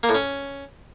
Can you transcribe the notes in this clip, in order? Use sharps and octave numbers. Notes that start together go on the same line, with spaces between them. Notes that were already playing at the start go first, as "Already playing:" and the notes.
A#3
A2
C#4